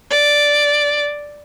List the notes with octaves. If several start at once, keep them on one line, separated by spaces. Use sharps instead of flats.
D5